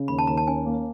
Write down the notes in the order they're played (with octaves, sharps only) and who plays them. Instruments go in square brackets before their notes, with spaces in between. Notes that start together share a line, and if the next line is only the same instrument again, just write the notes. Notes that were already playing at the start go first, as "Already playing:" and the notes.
Already playing: [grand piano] C#3
[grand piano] D#2 [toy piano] B5
[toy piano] A5
[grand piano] D#2 [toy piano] A#5
[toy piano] A5
[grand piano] C#4 [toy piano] G#5
[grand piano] A#3